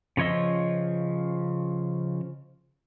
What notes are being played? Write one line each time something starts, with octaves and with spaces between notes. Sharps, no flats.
C#3 F3 C#5 D#5 E6